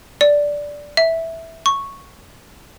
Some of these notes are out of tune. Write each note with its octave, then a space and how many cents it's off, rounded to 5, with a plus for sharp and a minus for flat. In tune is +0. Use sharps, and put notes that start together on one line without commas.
D5 -5
E5 -10
C#6 -5